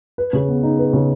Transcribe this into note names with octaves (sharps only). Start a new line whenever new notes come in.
B4
C#3
B3
D#4
B4
C#3